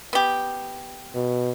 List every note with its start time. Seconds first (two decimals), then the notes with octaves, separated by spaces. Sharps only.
0.13 B3 G4
1.15 B2